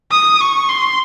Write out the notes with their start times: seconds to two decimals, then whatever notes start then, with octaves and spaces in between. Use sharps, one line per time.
0.11 D#6
0.41 C#6
0.69 C6